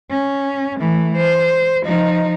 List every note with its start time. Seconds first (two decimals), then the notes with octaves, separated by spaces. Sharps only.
0.11 C#4
0.79 E3 A3
1.16 C5
1.84 F3 D#4